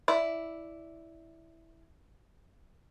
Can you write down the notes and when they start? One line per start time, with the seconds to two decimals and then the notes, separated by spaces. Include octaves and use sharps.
0.08 E4 D5